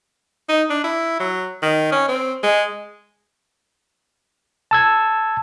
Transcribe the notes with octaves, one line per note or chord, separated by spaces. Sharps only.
D#4
D4
E4
F#3
D#3
C#4
C4
G#3
A5 E6 G#6